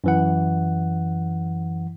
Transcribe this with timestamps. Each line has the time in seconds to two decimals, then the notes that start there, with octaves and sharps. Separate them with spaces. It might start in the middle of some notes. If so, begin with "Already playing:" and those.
0.04 F#2 E3 F#5